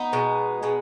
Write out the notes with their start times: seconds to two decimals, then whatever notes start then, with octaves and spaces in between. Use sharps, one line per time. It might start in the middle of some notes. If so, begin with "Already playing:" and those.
Already playing: B3 D#4
0.13 B2 G#3
0.63 B2 G#3